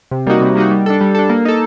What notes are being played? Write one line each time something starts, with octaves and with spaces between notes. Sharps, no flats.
C3
G3 A#3 D#4 F#4
C3
G3 A#3 D#4 F#4
G3
D4 A4
G3
D4 A4
A#3
D#4 A4